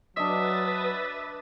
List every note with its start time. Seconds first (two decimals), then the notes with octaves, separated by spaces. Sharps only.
0.17 F#3 D4 B4 D#5 E5 D#6 A6